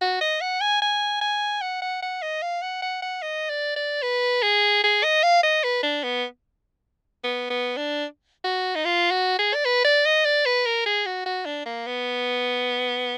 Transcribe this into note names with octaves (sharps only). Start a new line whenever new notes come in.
F#4
D#5
F#5
G#5
G#5
G#5
F#5
F#5
F#5
D#5
F5
F#5
F#5
F#5
D#5
D5
D5
B4
G#4
G#4
D#5
F5
D#5
B4
D4
B3
B3
B3
D4
F#4
D#4
F4
F#4
G#4
D5
B4
D5
D#5
D5
B4
A#4
G#4
F#4
F#4
D4
A#3
B3